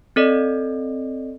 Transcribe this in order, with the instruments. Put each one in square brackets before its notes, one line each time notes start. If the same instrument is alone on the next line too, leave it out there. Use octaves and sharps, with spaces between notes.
[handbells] C4 A4 D5 D#5